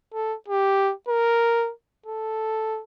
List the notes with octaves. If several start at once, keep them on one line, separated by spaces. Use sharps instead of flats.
A4
G4
A#4
A4